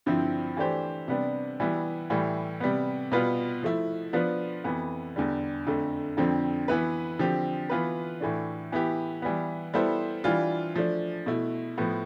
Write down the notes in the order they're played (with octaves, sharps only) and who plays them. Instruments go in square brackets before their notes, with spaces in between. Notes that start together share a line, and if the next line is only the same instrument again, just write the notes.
[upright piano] G2 D3 F3 C4 E4
E3 A3 D4 G4 C5
C3 G3 B3 D4
E3 G3 B3 E4
A2 E3 G3
C3 G3 B3
B2 G3 B3 F4 B4
F3 A3 E4
F3 B3 D4 F4 B4
F2 E3 B3
E2 D3 G3
F2 D3 A3
F2 D3 F3 C4
E3 B3 E4 B4
D3 F3 C4 G4
E3 B3 F4 B4
A2 E3 A3 D4
E3 B3 E4 G4
E3 G3 B3
G3 B3 E4 A4 C5
E3 G3 D4 F4
F3 A3 D4
B2 A3 E4
A2 F3 B3